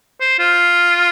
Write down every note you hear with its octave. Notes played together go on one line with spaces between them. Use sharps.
C5
F4